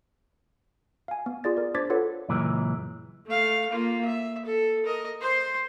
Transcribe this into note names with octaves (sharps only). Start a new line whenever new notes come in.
F5 G#5
B3
F4 G#4 D5 A6
A#4 D5
D4 C5 D6 G#6 A6 B6
F4 A4 B4 C#5 F#5
C#2 F#2 A#2 E3 G#3
A3 F5
A#3 F4
E5
A4
A#4 D#5
C5 C6